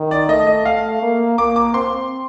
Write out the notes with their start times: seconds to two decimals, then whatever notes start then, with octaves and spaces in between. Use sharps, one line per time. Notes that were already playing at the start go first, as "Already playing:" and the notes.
Already playing: D#3
0.11 D5
0.29 A3 D#5
0.47 D#5
0.65 A3 F5
1.02 A#3
1.38 A#3 D6
1.56 D6
1.74 C4 C6